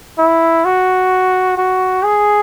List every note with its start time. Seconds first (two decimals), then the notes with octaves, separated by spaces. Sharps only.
0.18 E4
0.65 F#4
1.57 F#4
2.04 G#4